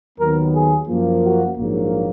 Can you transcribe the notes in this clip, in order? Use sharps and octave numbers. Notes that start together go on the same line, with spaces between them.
D#2 D#3 F#3 B3 A#4
G#4
F#2 F3 A#3
F#4
A#1 G#2 F#3 A#3